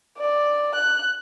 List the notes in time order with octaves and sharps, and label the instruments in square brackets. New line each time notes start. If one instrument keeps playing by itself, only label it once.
[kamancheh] D5
F#6